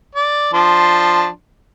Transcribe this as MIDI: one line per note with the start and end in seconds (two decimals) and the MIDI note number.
0.15 0.51 74
0.53 1.27 53
0.53 1.27 62
0.53 1.27 84